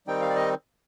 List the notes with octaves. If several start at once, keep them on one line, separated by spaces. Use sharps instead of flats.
D#3 G3 C4 D#4 G5
F5
D5
D#5